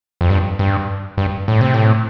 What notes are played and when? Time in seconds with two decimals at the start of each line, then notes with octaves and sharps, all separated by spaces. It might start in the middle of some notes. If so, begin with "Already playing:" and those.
0.21 F2
0.30 G2
0.59 G2
1.18 G2
1.48 A2
1.61 C3
1.74 A2